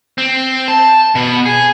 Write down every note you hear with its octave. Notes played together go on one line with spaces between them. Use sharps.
C4
A5
B2 B3
G#4